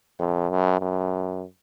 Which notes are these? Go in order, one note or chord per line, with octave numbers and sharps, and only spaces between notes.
F2
F#2
F#2